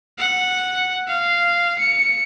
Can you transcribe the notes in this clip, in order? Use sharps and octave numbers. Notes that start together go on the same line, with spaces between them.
F#5
F5
C#7